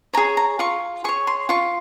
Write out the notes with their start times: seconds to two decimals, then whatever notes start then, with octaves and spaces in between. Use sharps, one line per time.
0.14 C#5 A#5
0.17 G#4
0.37 A#5
0.59 F4 C#6
1.04 G#4 C#6
1.09 C#5
1.27 C6
1.49 F4 C#6